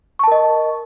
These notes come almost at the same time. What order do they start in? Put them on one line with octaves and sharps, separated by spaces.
C#6 A5 A#4 D#5